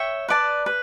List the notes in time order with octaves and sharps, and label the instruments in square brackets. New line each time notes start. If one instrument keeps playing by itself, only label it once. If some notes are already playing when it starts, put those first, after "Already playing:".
Already playing: [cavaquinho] C#5 E5 G5
B4 D5 A5
B4